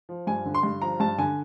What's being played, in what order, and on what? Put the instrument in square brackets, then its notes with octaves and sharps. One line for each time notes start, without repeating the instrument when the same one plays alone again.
[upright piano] F3
G2 G#5
D3
C6
G2
F3 A#5
G2 A5
D3 G#5